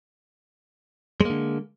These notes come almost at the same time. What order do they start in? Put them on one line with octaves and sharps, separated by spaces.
G#3 A#3 D3